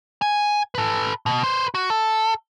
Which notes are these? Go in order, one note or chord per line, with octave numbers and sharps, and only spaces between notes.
G#5
A4 B4
B2
B4 C5
F#4
A4